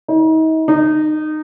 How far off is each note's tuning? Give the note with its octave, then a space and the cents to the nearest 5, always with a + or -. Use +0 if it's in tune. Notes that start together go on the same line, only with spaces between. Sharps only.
D#4 +40
D#4 -20